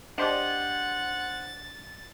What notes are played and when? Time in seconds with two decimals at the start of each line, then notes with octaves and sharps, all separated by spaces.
0.18 D4 G4 C5 D#5 F#5 A6